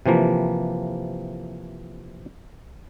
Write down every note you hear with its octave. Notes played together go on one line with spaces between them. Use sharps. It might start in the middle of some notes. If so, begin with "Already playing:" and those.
C3 E3 F3 A#3